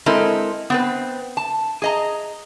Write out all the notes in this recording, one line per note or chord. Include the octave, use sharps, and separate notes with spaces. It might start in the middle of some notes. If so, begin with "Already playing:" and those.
G#3 C4 E4 A4 A#4 D#5
B3 C4 B4
A5
G#4 D#5 A#5